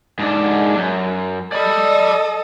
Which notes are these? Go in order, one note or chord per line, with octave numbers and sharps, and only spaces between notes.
G#2 D4
F#2
A4 D5 D#5 B5